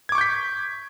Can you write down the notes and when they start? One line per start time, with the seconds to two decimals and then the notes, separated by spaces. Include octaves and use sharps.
0.09 G#6
0.12 D6
0.15 C#6
0.18 G6
0.21 B6